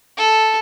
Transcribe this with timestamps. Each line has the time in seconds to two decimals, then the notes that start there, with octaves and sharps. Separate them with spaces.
0.17 A4